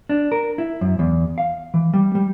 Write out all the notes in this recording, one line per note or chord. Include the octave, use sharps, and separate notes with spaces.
D4
A#4
E4
F#2
E2
F5
E3
G3
G3